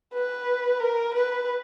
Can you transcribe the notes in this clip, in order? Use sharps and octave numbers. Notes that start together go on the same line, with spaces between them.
B4
A#4
B4